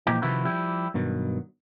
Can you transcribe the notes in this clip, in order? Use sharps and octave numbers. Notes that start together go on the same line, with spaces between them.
A#2 E3 F3 D#4 G4
C3 D#3 F3 E4 F#4 B4
F3 G3 E4 G4
G2 B2 D#3 F#3